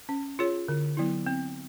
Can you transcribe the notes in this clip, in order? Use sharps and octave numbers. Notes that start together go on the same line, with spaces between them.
C#4
F4 G#4 C#5
D3
F#3 B3 E4
C4